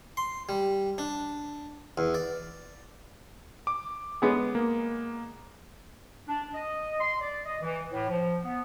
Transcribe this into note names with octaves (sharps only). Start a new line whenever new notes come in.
C6
G3
D4
E2
D5
D6
G#3 B3 G#4
A#3
D4
D#5
C6
D5
D#5
E3
A2
F3
B3